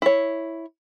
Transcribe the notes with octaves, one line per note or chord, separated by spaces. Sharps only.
E4 C#5